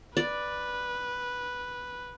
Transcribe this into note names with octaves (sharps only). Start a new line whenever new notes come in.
B4 D5